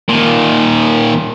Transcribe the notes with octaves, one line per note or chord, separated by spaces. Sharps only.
A#2 D#3